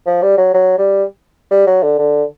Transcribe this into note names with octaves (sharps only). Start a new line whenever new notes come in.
F3
G3
F#3
F#3
G3
G3
F#3
D3
D3